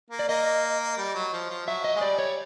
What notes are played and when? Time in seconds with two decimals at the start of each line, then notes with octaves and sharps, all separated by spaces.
0.11 A#3
0.19 D5
0.28 A#3 D#5
0.98 G3
1.15 F#3
1.33 F3
1.50 F3
1.67 F#3 E5
1.84 D#5
1.96 G#3
2.01 G3 D5
2.19 C#5